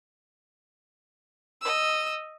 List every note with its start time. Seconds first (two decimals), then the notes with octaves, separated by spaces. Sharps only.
1.61 D#5 E6